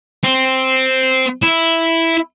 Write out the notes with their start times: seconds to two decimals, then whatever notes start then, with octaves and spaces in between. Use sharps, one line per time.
0.23 C4
1.43 E4